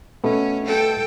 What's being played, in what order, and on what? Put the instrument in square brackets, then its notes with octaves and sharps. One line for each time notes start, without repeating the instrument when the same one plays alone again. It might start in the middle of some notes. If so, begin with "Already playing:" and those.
[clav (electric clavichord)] B2 A3 B3 [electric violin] C#4
[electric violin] A4 G5